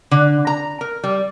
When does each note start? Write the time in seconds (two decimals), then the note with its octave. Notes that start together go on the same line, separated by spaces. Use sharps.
0.11 D3
0.47 A#5
0.81 A#4
1.04 G3